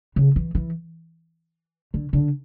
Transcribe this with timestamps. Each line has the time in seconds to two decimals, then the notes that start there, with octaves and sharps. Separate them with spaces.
0.16 C#3
0.36 E3
0.55 E3
1.94 D3
2.13 D3